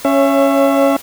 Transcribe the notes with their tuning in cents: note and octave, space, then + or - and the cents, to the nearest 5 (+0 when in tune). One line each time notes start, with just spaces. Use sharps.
C#4 +0 C#5 -15 E5 +25